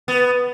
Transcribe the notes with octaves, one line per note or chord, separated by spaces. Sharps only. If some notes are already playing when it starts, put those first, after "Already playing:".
B3